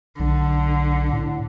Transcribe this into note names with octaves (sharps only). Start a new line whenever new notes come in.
B1 D3
A2